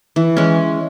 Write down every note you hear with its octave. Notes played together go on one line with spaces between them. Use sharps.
E3
G#3 C#4